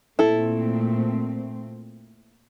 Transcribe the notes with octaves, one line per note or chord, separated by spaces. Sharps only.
A#2 A3 C4 E4 A4